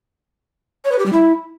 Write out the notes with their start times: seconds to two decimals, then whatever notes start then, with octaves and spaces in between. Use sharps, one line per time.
0.85 C#5
0.92 B4
0.99 G4
1.06 G3
1.13 E4